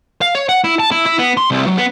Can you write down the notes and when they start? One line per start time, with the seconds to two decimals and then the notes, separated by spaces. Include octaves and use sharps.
0.21 F5
0.35 C#5
0.49 F#5
0.64 E4
0.80 A5
0.91 E4
1.06 E4
1.19 B3
1.37 C6
1.51 C2
1.67 F#3
1.78 B3